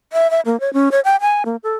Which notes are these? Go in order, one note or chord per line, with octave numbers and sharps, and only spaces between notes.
E5
E5
A#3
C#5
C#4
C#5
G5
G#5
A#3
A4